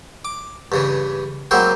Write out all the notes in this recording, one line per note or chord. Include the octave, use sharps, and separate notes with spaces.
D6
G2 C#3 E3
F#3 G#3 A#3 C4 E4 C5